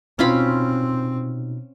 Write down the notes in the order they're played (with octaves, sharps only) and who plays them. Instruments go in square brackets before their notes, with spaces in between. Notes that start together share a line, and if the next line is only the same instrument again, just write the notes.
[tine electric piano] B2 D#4 [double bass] C4 [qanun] C#4 F4 B5